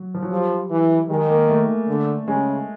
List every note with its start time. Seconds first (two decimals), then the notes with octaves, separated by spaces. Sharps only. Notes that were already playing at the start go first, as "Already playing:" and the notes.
Already playing: F#3
0.15 F3
0.23 F#3
0.31 F3 G3
0.70 E3
1.09 D#3 G#3
1.29 A#3
1.49 A3
1.88 D3
2.27 C#3 G#3